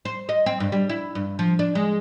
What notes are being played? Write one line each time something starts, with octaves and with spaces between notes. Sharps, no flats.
C5
D#5
C4
G2
G3
E4
G2
F3
D4
G#3